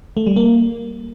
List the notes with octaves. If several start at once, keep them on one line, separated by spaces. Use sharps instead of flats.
A3
G3
A#3